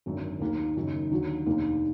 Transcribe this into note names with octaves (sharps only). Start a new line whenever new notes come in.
G#1 F#2 D3
D#2 D#3 A#3
F#1 F#2 D#3
D#2 D3 F#3
F1 D#2 D#3 A#3 D4